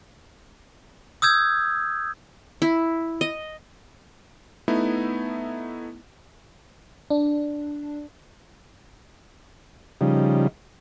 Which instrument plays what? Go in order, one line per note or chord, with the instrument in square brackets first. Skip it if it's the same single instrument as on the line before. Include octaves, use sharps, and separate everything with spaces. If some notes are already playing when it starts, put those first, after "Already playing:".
[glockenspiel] D#6 E6 G6 G#6
[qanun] E4
D#5
[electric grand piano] A3 B3 D#4 E4
[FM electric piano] D4
[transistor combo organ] C#3 F3 G3 D#4